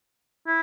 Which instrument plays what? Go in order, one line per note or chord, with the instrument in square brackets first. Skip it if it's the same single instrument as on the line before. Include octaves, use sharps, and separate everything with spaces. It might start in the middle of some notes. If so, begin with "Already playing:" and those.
[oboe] E4